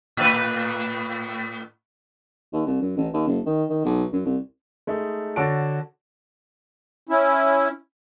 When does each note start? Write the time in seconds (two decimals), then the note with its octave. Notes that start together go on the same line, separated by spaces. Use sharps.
0.17 A2 B4
2.53 D#2
2.66 C2
2.82 F#2
2.97 A1
3.14 D#2
3.27 F#1
3.46 D#3
3.69 D#3
3.85 B1
4.12 F#2
4.25 C2
4.87 G#3 A3 D#4
5.36 D3 F#4 C#5 A5 D7
7.09 C#4 E4